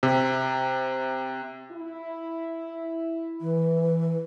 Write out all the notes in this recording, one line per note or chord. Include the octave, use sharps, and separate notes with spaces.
C3
E4
E3